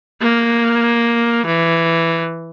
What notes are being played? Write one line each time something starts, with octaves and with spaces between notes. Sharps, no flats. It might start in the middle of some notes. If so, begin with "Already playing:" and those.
A#3
E3